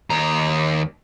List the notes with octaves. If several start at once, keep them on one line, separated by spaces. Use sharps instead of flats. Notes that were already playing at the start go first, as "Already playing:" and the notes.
D#2 A#5